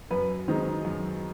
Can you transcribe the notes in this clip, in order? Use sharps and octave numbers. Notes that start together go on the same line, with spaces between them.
F#2 B4
D#3 G#3 C4 D#4
F#2